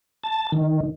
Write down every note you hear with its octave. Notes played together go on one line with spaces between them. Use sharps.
A5
D#3